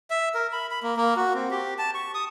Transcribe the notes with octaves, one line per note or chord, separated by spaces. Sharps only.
E5
A#4
B5
B5
A#3
A#3
F#4
C4
G4
A5
C#6
D#6